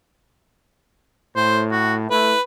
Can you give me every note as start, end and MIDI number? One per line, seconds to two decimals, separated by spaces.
1.36 2.07 45
1.36 1.62 72
1.71 1.95 66
2.11 2.33 57
2.11 2.33 64
2.11 2.42 71